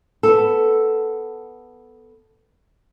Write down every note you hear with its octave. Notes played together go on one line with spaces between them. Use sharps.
B3 A4